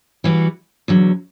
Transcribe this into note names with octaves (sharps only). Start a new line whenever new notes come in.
E3 G3 B3 F#4
E2 D3 F#3